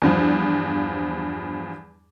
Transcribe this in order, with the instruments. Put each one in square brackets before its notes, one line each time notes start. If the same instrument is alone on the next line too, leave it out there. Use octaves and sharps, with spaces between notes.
[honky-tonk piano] E2 G2 F3